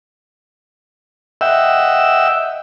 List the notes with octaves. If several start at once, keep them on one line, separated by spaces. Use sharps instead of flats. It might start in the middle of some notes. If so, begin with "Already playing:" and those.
D#5 E5 F#5 G5 E6